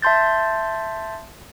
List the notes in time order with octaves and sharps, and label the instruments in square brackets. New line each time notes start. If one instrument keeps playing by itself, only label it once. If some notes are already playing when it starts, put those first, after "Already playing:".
[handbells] E5 A5 C6 G6 A6